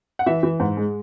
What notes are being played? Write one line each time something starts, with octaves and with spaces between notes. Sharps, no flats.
F#5
E3 E5
E3
G#2
G#3